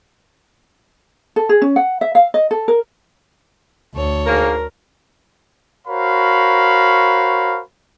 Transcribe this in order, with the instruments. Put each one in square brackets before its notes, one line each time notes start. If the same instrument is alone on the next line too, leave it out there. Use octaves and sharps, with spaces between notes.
[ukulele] A4
G#4
C#4
F#5
E5
F5
D#5
A4
A#4
[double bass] D2 [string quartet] A4 C#5
[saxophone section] G#2 A#3 [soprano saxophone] A#4
[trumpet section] F#4 A#4 C5 C#5 F5 B5